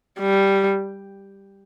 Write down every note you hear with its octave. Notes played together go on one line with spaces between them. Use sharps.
G3